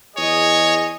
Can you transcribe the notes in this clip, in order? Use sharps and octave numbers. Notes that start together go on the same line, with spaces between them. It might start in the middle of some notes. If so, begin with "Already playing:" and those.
E2 G#4 C#5 D#5